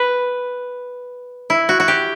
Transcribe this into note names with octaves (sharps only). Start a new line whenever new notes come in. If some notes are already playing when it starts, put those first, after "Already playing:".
Already playing: B4
E4
F#4
F#4
G4